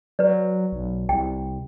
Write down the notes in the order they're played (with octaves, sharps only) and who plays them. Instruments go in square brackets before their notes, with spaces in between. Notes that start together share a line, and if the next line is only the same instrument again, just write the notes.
[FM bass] F#3 [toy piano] B4 D5
[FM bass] B1
[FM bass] C2 [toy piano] G5